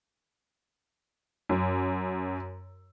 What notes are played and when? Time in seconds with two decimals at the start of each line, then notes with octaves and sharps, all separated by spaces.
1.49 F#2